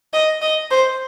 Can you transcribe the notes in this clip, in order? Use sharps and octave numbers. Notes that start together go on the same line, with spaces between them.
D#5
D#5
C5